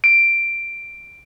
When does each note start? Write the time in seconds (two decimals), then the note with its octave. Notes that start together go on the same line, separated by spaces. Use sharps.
0.04 D7